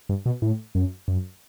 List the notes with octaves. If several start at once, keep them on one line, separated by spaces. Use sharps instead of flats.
G2
B2
A2
F#2
F#2